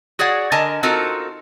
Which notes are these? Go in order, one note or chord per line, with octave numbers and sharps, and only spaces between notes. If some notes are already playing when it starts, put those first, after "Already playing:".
F#4 G#4 C#5 D5 F#5
D3 A#4 D#5 G#5 A5
C4 D#4 F4 F#4 A4 A#4